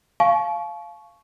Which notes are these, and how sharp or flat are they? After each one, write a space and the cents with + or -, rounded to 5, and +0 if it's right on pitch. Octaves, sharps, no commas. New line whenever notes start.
F5 -10 A5 -40 C#6 +0